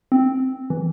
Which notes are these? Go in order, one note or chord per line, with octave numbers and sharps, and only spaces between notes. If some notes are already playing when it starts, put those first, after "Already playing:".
C4
E3